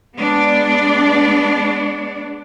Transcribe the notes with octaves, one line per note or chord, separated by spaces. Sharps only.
G#3 B3 D4 D5